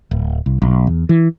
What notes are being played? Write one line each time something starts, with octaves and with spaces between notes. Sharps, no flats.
D1
C2
B1
E2
E3